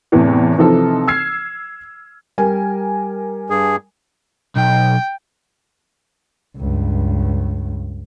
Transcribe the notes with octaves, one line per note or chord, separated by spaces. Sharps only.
E2 A2 C3 E3
C3 E3 F3 D#4 A4
E6 F6 G#6 C7
G3 A#4 G#5
G2 G#4
B1 G5
C#2 G2